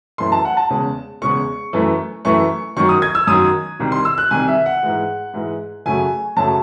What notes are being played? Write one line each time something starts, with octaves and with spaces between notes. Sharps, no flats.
F#2 E3 A3 C6
A5
F#5
A5
E2 C#3 G#3
E2 C#3 G#3 C#6
F#2 E3 A3
F#2 E3 A3 C#6
F#2 D#3 F#3 C#6
D#6
G#6
E6
F#2 D#3 F#3 D#6
C2 C3 D#3
C6
E6
F#6
C2 C3 D#3 G#5
E5
F#5
G#2 E3 G#3
G#2 E3 G#3
F#2 C#3 F#3 A3 G#5
F#2 C#3 F#3 A3 A5